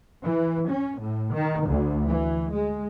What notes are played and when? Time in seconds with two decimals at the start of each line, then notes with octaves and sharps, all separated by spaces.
0.24 E3
0.68 C#4
0.99 A2
1.33 D#3
1.67 D2
2.07 E3
2.52 G#3